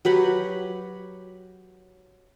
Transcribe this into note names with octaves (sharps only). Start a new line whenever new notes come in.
F#3 G4 B4 F#5